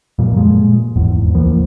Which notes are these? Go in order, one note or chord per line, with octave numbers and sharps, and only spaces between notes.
F#2 A#2 F3 G3
A#2 G#3
G#1 E2
D2 E3 F3 A#3